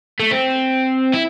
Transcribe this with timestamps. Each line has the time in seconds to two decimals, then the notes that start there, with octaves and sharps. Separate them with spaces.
0.19 A3
0.31 C4
1.14 E4